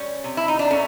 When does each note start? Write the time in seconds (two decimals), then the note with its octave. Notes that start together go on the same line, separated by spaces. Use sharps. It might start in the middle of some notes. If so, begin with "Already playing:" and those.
Already playing: G3 C#4
0.24 C3
0.37 E4
0.48 D#4
0.59 D4
0.70 A3 C#4